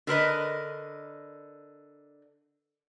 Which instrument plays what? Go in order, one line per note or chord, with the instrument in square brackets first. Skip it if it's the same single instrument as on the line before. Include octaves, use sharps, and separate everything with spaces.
[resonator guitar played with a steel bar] D3 A#4 B4 D#5